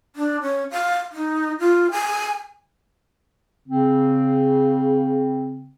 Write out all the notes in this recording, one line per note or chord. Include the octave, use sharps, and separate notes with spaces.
D4
C#4
F5
D#4
F4
G#5
C#3 C4